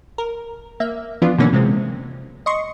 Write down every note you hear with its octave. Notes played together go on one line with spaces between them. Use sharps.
A#4
A#3 E5
E3 F3 B3 D4 F4
B2 D3 E3 F#3 A#3 C#4
C3 G#3 C4
D#5 C6 C#6